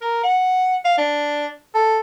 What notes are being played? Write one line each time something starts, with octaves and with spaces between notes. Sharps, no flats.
A#4
F#5
F5
D4
A4